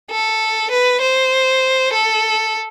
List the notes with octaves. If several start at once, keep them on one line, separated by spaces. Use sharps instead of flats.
A4
B4
C5
A4